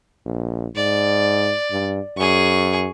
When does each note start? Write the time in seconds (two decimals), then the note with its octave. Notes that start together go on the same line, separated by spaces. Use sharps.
0.25 A#1
0.76 G#2 D5
1.71 G2
2.17 F#2 G#4 C#6